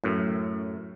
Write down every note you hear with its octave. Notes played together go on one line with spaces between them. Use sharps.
F#2 A2